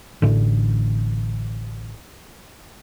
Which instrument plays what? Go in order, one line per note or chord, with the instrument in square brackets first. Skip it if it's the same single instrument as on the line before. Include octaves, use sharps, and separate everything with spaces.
[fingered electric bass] A1 A2 D3